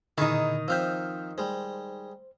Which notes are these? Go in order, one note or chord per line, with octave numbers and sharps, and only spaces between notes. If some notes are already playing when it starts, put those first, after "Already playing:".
A#2 D3 D#3 D#4 E4 G#4 C#6
F3 C4 E5 E6 F6 G6
G3 G#3 C5